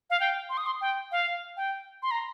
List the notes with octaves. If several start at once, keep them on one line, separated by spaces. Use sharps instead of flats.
F5
G5
C6
D#6
C6
G5
F5
G5
C6
A#5